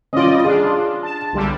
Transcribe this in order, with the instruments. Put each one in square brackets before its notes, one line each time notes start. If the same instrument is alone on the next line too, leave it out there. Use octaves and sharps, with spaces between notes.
[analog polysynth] G3 D5 D#5 [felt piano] C#4 F4
[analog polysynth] D4 F4 [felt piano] G#4
[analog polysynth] A5
B1 D3 G3